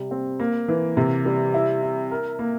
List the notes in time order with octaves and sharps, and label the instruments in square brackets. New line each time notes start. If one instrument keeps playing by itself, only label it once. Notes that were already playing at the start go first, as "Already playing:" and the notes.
Already playing: [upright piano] C3 G3
C4
A#3
E3
C3
G3
E4
E4
A#4
A#3